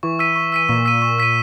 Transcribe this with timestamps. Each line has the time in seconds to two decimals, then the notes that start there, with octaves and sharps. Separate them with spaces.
0.03 E3 C#6
0.19 E6 B6 D#7
0.36 C#6
0.52 E6 B6 D#7
0.69 A#2 C#6
0.85 E6 B6 D#7
1.02 C#6
1.19 E6 B6 D#7